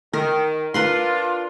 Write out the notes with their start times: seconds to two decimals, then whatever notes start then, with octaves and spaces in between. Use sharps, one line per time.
0.13 D#3 A#4
0.74 D4 F4 A#4 B4 C6